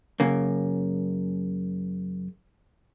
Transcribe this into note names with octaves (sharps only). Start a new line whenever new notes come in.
F#2 C#3 A#3